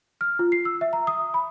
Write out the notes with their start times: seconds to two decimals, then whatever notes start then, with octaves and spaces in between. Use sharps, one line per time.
0.21 F6
0.39 F4
0.52 C7
0.65 E6
0.81 E5
0.93 A#5
1.07 D#6
1.34 B5